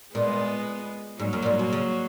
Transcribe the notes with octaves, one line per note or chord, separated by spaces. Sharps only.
A#2 G#3 B3
G#2 F#3 A#3
F#2
A#2
G#2
B2
C#3